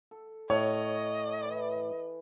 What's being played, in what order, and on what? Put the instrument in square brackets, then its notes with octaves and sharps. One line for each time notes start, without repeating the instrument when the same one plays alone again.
[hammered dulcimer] A4
[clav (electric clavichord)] A2 [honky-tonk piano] C#5 [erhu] D#5
[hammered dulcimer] E3 B4